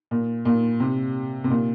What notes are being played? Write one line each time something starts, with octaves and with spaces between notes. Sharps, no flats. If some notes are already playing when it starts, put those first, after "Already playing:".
A#2
A#2
C3
C3
A#2